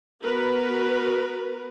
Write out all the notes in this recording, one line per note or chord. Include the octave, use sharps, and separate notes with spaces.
B3 F#4 A#4 B4